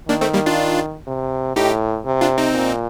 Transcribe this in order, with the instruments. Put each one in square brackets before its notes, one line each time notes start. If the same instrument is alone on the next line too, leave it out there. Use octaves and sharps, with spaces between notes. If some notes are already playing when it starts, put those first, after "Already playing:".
[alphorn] D#3 [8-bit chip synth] A#3 D4
[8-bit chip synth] A3 C4
G3 A#3
D4 F4
[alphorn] C3
[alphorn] A2 [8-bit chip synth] D#4 G4
[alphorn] C3
[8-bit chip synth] D4 F4
C4 D#4
[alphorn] A#2